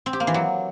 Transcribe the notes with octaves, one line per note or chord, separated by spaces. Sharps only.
C4
G4
A#3
E3
F#3